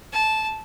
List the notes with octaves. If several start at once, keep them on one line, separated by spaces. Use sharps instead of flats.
A5